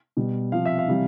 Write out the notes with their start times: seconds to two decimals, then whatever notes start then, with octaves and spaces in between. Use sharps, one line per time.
0.17 B2 G3
0.52 C3 F3 F5
0.66 E5
0.79 F5
0.88 C3 E3 G3